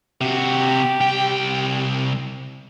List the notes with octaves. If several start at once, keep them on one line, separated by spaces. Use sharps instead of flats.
C3 F#4 G4
C2 G5